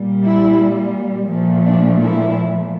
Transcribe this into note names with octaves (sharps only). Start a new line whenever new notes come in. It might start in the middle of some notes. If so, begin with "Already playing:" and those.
Already playing: A#2 G3
E4
A#2 F3 A3
D4
E4